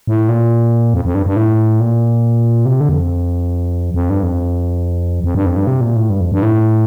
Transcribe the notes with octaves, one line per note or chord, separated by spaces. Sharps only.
A2
A#2
F2
F2
G2
G2
A2
A#2
C3
D3
E2
F2
F2
G2
F2
F2
G2
F2
G2
C3
A#2
A2
G2
F2
G2
A2